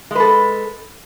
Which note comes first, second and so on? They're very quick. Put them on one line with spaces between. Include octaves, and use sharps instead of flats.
G#3 B4 A4